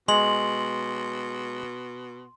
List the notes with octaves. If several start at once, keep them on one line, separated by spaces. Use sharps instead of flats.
B2 G#3 C6 F#7